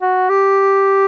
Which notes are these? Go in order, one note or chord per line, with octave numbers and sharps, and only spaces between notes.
F#4
G4